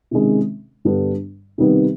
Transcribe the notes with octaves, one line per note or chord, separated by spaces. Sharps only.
C3 D#3 G#3 C#4
G2 D3 G3 B3 D4
C3 D#3 G3 B3 D#4